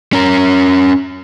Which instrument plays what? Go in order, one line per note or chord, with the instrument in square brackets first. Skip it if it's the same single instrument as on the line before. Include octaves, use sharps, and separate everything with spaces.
[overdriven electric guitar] C#4 A#4